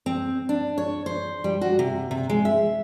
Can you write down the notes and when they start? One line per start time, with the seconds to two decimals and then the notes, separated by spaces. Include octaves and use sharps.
0.06 C4
0.49 D4
0.78 C#5
1.06 C5
1.44 G3
1.61 F#4
1.79 C3
2.11 C3
2.30 G#3
2.45 E5